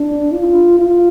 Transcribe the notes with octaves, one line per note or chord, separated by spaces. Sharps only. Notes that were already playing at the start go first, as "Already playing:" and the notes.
Already playing: D4
F4
F4